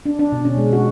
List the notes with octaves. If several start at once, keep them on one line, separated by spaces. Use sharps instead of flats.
D4
D4
B2
C#4
G#3
F#4